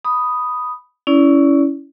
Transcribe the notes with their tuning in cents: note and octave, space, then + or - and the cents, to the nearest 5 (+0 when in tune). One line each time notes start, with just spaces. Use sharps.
B5 +0 D#6 +0
C#4 +15 E4 +0 D5 -30